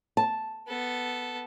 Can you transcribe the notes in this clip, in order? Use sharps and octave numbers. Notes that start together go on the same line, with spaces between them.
A5
B3 A4